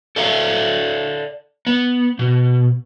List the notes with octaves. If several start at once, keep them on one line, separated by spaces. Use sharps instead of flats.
A4 D5 E5 F5
B3
B2